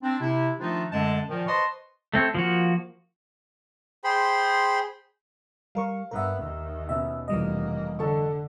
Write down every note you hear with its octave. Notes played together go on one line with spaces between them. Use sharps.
C4 D4
C3 E4
D#3 F3 A3 D4 D#4 F4
F#2 D3 G#3 A3 A5
A#2 D#3 F3
B4 C5 D#5 A5 C6 C#6
A3 C4 C#5
F3 A#3 F#4
G#4 C5 G5 B5 C6
G3 A#4 F5 C#6
G2 B3 A#4 E5
D#2 D#3
B2 B3 C#4 E5
F1 E3 G3 A#3 D#5
D3 A4 C#6